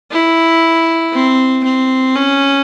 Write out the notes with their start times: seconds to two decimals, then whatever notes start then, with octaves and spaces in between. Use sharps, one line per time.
0.11 E4
1.13 C4
1.64 C4
2.16 C#4